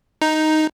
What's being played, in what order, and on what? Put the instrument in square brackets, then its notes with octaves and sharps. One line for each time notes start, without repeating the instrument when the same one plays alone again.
[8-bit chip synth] D#4